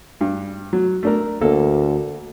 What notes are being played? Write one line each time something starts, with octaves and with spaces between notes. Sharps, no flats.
G2
F#3
A3 D4 A#4
D2 A#3 A4